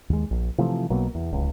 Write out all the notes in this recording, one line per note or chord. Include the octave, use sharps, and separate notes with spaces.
D#2 G#3
A#1
C3 E3 F3 A3
B1 B2 F#3 A#3
E2
D1 C#2